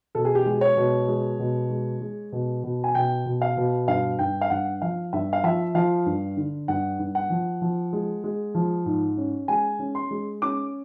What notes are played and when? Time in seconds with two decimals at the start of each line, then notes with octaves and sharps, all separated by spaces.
0.15 B2 A4
0.25 G#4
0.35 G4
0.46 G#3 G#4
0.61 C#5
0.77 B2
1.08 G#3
1.39 B2
1.70 G#3
2.01 G#3
2.32 B2
2.64 B2
2.84 G#5
2.95 B2 G5
3.26 B2
3.41 F5
3.57 B2
3.88 G2 F5
4.19 G2 G5
4.41 F5
4.50 G2 F#5
4.82 F3 F5
5.13 G2 E5
5.33 F5
5.43 F3 E5
5.75 F3 F5
6.06 G2
6.37 D3
6.68 G2 F#5
6.99 G2
7.15 F#5
7.30 F3
7.61 F3
7.93 G#3
8.24 G#3
8.55 F3
8.86 G#2
9.17 C#4
9.48 G#3 G#5
9.79 C#4
9.95 C6
10.11 G#3
10.42 C#4 D6